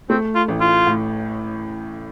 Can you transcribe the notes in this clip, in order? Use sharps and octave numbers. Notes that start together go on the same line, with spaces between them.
A3 C4
F4
A1
F4
A2